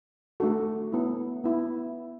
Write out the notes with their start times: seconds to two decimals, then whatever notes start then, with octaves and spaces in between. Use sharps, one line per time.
0.40 A3 D4 F#4 A4
0.92 B3 E4
1.44 B3 E4